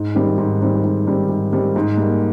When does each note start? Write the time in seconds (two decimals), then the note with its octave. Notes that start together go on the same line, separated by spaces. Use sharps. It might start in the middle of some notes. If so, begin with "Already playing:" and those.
Already playing: G#2
0.15 D#3 G3 C4
0.38 G#2
0.61 D#3 G3 C4
0.84 G#2
1.07 D#3 G3 C4
1.29 G#2
1.52 D#3 G3 C4
1.76 G#2
1.97 G3 A#3